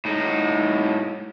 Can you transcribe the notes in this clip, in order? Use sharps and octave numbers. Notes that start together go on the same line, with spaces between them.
A2 D#4